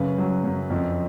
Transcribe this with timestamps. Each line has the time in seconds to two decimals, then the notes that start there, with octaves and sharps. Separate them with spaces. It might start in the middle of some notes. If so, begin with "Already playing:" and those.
Already playing: F#2 C#3 B4
0.18 F#3
0.44 F#2
0.70 F2